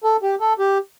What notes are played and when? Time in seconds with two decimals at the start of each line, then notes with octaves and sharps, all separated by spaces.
0.04 A4
0.23 G4
0.41 A4
0.59 G4